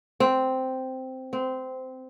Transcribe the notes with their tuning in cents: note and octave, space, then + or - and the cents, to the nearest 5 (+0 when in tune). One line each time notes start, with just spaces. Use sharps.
C4 -5
C4 -15